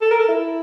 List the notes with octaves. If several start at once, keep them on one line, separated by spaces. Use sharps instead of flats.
A4
A#4
A4
E4